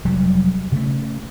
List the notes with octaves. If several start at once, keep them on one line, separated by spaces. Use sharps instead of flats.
F1 F#3 G3
C#3 A3